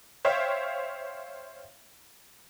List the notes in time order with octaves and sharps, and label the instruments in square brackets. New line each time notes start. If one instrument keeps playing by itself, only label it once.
[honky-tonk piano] C5 C#5 E5 F5 G5